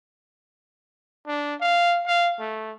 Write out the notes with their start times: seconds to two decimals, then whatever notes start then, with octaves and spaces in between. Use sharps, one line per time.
1.27 D4
1.61 F5
2.07 F5
2.39 A3